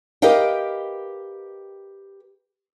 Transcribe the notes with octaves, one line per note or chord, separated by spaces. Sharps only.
G4 A#4 B4 D#5 F5 G5